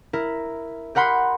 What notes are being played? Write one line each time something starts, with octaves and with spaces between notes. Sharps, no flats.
E4 A#4
G4 A#4 F#5 B5 C6